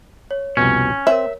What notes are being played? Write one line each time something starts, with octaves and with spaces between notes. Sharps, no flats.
C#5
C2 F2 B2 C#4
C4 A#4 C#5 E5